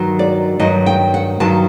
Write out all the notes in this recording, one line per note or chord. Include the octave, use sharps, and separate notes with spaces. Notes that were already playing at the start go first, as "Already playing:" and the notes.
Already playing: G2 D#3 F#3
D5
G2 D#3 F#3 D#5
G5
F#5
G2 D#3 F#3 A5